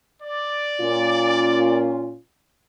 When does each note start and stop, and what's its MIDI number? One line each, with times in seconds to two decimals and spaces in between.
0.22 1.83 74
0.81 2.16 46
0.81 2.16 61
0.81 2.16 65